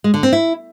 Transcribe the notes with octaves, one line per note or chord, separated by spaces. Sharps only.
G#3
D3
C4
E4